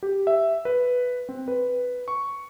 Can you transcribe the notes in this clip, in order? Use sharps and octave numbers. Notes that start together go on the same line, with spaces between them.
G4
E5
B4
C4
B4
C#6